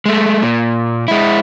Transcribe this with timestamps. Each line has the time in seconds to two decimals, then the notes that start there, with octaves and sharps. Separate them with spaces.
0.06 G#3 A3
0.42 A#2
1.08 G#3 E4